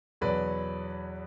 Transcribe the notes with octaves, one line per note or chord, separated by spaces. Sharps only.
E2 B2 F#3 B4 D5